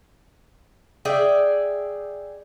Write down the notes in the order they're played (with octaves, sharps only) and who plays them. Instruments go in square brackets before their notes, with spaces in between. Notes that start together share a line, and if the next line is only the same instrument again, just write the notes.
[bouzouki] G#4 D5 E5 G5